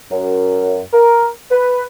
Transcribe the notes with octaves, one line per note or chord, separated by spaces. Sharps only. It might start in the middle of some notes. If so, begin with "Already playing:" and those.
F#2
A#4
B4